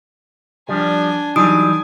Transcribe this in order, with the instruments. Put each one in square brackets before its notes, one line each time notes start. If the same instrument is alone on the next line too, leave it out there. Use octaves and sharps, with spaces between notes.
[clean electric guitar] F3 G3 [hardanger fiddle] D4 G#5
[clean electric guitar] E3 F#3 G3 [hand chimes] D#4 D#6 D7 [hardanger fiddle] G#5